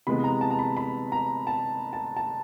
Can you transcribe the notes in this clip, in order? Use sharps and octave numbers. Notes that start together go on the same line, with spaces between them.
C3 E3 G#3 B3 B5
A#5
A5
A#5
B5
B5
A#5
A5
A5
A5